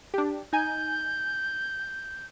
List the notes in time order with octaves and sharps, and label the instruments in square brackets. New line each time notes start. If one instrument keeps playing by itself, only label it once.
[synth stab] D4 G4
[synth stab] D#4 G#5 [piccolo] G6